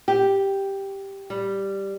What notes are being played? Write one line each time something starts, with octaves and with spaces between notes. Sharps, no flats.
G4
G3